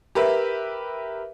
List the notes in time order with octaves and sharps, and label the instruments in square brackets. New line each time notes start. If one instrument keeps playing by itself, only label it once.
[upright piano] G4 A#4 B4 E5